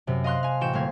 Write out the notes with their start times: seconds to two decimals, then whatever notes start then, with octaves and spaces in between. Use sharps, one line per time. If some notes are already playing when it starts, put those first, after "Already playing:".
0.07 F#2 C3
0.24 D#5 F5 C6 F#6
0.43 F5 G#5
0.61 A1 F#4 G5 E7
0.73 G1 A#3 F5 G#6